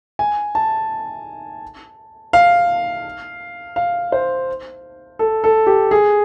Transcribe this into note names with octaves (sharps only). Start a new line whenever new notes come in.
G#5
A5
F5
F5
C5
A4
A4
G4
G#4